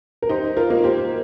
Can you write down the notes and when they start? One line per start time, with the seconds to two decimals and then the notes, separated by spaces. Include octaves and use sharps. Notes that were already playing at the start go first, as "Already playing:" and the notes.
0.22 A#4
0.29 D#4 G4 C5
0.57 F4 A#4
0.70 A#3
0.84 G4 C5